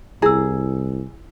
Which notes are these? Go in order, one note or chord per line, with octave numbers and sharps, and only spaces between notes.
C2 E4 G#4 E6